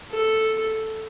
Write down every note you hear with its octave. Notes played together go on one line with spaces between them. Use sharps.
A4